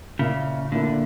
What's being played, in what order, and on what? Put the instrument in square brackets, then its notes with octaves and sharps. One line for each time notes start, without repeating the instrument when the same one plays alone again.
[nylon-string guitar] A#2 A#3 E4 [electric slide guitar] C#3
[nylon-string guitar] A#2 A#3 E4 [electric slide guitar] D3